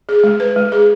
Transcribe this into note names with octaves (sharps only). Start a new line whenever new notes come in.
G#4
G#3
B4
G#3
G#4